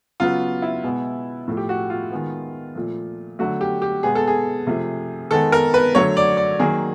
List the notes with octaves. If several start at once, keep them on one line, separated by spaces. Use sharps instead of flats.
C#3 F#3 B3 F4
E4
B2 G#3 B3
A2 F3 A3
G4
F#4
F4
D#3 G#3 B3
A#2 F3 A3
D3 F#3 A3 F#4
G4
G4
B2 G#3 B3 G#4
A4
G#4
C3 F3 A3
D#3 G#3 B3 A4
A#4
B4
D3 F#3 A3 C#5
D5
D5
D#3 F#3 A#3 G#4